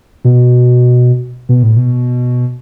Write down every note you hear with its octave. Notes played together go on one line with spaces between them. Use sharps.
B2
B2
A2
B2